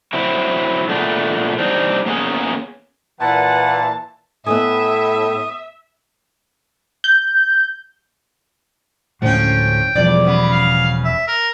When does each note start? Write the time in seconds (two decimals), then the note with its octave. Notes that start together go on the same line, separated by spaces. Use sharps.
0.13 F#3 C4 E4
0.89 A#2 G#3 A3 B3 D4
1.58 G3 C4 D4 D#4
2.06 A#3 B3 C#4 G#4
3.21 A#2 E3 B4 F#5 A5
4.46 A2 B3 D#5 E5 G#5 D#6
7.04 G6
9.22 D2 A2 F3 G#3 C#4 G5
9.95 E1 E2 F3 G3 D5
10.25 C#3 B3
10.52 F5
11.04 E5
11.27 A#4